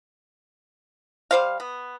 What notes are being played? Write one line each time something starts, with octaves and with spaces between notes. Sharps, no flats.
G3 C5 F5
B3